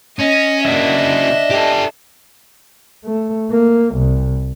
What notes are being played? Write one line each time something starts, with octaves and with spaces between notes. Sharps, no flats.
C#4 D#5
C#3 A#3 D4 D#5 E5 F#5
G4 A4
A3
A#3
C2